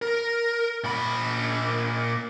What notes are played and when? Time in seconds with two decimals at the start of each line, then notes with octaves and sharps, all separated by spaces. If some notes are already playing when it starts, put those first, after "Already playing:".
0.02 A#4
0.84 A#2 B5